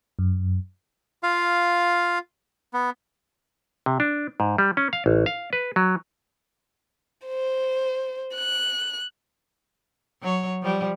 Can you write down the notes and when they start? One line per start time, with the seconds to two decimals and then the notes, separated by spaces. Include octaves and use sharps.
0.19 F#2
1.23 F4 F5
2.74 B3
3.86 C3
4.00 D4
4.40 G#2
4.58 G3
4.77 C#4
4.93 F5
5.06 A1
5.26 F5
5.53 B4
5.76 F#3
7.26 C5
8.36 F#6
10.22 F#3 C#5
10.62 F3 G3